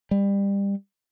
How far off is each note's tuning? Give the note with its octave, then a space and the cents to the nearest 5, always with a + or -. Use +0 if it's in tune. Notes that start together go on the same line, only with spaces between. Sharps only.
G3 +25